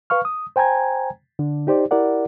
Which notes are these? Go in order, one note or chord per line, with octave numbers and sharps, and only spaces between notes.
B4 F5 C#6 F6
D#6
C5 G5 G#5 A#5 G#6
D3 D4
D#4 G4 C5 D5
E4 G4 A#4 D5 F#5